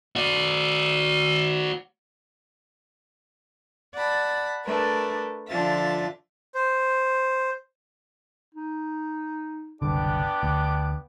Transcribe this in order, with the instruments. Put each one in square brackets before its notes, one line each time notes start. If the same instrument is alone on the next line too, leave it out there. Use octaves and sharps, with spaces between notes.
[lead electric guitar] F#4 D5
[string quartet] D5 F#5 A5 B5
A3 D4 A#4 B4
D3 F3 D4 F4 E5 A6
[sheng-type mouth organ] C5
[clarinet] D#4
[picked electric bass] F#1 C2 D3 [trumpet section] B3 D4 G4 [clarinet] D6
[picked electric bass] D2